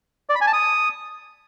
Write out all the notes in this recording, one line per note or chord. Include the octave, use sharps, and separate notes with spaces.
D5
B5
G#5
A5
D#6